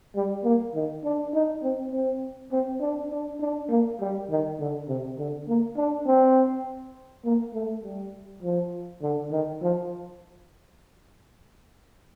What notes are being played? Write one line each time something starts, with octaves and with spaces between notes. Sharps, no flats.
G3
A#3
D#3
D4
D#4
C4
C4
C4
D4
D4
D4
A#3
G3
D#3
D3
C3
D3
A#3
D4
C4
A#3
A3
G3
F3
D3
D#3
F3